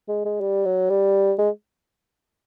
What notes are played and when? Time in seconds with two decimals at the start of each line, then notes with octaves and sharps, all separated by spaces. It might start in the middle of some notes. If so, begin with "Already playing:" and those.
0.08 G#3
0.25 G#3
0.41 G3
0.65 F#3
0.90 G3
1.39 G#3